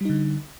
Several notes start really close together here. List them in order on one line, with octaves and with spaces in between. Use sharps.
G3 D#4 D3